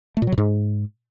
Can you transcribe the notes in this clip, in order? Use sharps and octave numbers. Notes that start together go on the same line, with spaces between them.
A3
A#2
F#3
B2
G#2